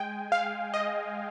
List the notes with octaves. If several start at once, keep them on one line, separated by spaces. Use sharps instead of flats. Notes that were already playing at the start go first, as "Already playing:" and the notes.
Already playing: G#3 G5 G#5
F5
D#5